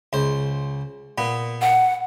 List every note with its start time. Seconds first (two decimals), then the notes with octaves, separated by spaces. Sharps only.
0.13 C#2 C5
1.18 A#2 B3
1.62 F#5